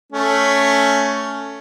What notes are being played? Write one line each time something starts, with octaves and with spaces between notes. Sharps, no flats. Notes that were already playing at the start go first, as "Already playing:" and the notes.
A3 C#4